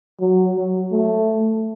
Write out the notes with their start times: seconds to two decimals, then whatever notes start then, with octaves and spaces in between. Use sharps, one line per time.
0.20 F#3
0.56 F#3
0.92 A3